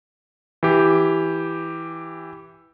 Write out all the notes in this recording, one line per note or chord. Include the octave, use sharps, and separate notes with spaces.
E3 G4